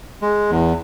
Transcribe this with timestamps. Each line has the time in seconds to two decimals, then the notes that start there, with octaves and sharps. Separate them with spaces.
0.22 G#3
0.50 E2